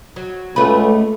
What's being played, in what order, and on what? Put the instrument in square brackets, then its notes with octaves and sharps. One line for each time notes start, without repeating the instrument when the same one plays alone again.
[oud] F#3
[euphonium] C#2 [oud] A3 B4